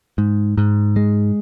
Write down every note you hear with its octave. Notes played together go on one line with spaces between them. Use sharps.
G#2
G#2
G#3